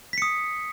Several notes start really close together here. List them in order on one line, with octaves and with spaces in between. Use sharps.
B6 C#7 D#6